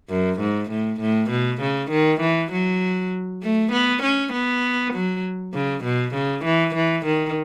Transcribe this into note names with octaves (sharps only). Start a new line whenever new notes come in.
F#2
G#2
A2
A2
B2
C#3
D#3
E3
F#3
A3
B3
C#4
B3
F#3
C#3
B2
C#3
E3
E3
D#3